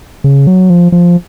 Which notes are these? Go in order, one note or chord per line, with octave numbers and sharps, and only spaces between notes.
C#3
F#3
F3
F3